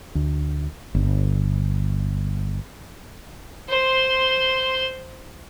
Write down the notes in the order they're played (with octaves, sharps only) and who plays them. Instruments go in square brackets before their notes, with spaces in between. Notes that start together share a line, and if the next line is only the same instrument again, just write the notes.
[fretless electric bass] D2
G1
[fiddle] C5 C6